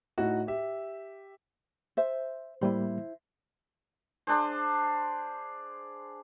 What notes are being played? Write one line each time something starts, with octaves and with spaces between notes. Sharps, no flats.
A2 D#4 F#4
G4 E5
C5 E5
A2 G3 A#3 E4 C5
D4 G#4 C5